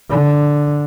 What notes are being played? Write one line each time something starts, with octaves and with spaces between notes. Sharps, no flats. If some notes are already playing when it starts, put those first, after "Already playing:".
D3